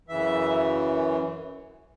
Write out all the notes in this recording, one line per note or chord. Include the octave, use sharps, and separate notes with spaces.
F#2 C#3 E3 E5